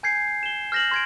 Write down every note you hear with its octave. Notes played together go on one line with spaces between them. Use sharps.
G#5 G6 G#6 C7 C#7
E7 G7
F6 G6 A#6 E7 F#7
C6 G#6 D7